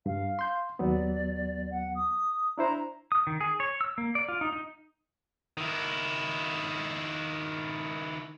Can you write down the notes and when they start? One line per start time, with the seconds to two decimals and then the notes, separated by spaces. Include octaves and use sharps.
0.06 G2 F5
0.39 C6 G6
0.79 D#2 F#3 B3 D5
1.70 F#5
1.95 D#6
2.58 D4 E4 C5 A#5
3.12 D#6
3.27 D#3
3.41 G#4
3.60 C#5
3.81 E6
3.98 A#3
4.15 D5
4.29 F4
4.41 D#4
4.53 D#4
5.57 D#3 E4